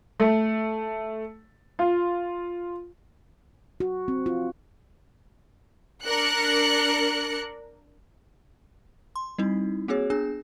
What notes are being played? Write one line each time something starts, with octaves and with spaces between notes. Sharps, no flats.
A3
F4
F#4
C4
F4
D4 A#4 F#6 C#7
C6
G3 C4 D#4 E4
A#3 C4 F#4 G#4 C#5
B3 D4 G#4 G#5